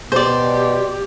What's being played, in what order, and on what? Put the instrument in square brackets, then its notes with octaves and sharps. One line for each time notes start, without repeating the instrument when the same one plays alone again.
[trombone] B2 [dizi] G4 [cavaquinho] C5 D5